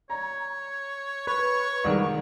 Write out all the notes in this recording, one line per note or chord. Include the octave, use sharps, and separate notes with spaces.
C#5 A#5
B4 C#5 C#6
C2 D#3 G#3